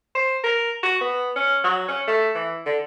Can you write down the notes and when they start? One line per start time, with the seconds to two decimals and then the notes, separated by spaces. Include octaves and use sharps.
0.15 C5
0.44 A#4
0.83 F#4
1.01 B3
1.36 C#4
1.64 F#3
1.88 C#4
2.07 A3
2.35 E3
2.66 D3